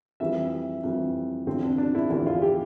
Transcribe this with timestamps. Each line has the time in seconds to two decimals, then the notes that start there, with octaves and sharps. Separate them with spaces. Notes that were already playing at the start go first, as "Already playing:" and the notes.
0.20 F2 E3 G3 E5
0.83 F2 E3 G3
1.47 E2 D3 F3 C4
1.63 D4
1.78 D4
1.95 E4
2.10 E2 D3 F3 E4
2.26 F4
2.42 G4